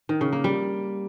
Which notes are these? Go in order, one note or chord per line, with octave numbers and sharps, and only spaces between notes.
D#3
C#3
A#3
G3